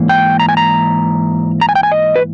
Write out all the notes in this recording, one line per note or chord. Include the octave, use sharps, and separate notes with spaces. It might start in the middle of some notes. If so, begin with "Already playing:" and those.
Already playing: G#2 E3 A#3
G5
A#5
G#5
A#5
A#5
G#5
G5
G#5
D#5
B4